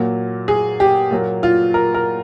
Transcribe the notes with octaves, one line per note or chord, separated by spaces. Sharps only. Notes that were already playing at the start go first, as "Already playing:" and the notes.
Already playing: A#2 F#3 A#3
G#4
G4
A#2 F#3 A#3
F4
A#4
A#4